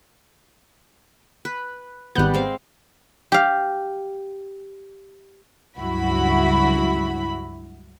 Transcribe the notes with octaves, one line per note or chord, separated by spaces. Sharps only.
B4
G#1 G3 B3 F#6 G6
G#3 C4 F5
G4 F5
C#2 G2 F#3 E4 F#4 B5